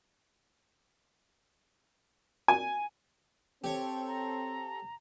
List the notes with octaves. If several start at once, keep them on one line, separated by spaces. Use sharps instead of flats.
G#5
C4 G4 A4 C#5
A#5